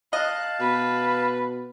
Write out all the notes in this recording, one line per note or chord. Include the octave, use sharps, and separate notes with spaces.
D#5 F5 A5 F#6
B2 B4